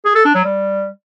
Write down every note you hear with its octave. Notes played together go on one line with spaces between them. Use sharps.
G#4
A4
D4
F#3
G3